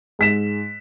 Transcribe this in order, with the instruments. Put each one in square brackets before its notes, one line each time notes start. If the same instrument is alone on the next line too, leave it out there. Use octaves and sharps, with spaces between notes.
[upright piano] G#2 B6 E7